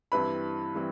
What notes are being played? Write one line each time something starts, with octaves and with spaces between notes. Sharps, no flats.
G2 E3 G3 C4 E4 B4 B5
E3 G3 C4 E4